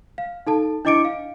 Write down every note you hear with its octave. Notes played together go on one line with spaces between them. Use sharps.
F5
D#4 A4 A5
D4 E4 D#5 D6 C#7 D7
F5